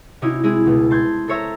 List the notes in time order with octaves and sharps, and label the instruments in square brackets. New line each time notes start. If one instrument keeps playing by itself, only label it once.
[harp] C3 C#4 D#4 E4 F#4
G#3 C4 E4 G#4
C#2 B2
A5 C6 G6 G#6
A4 C5 C#5 E5 A#5